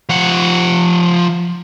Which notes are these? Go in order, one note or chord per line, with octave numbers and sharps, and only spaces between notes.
F3 F#5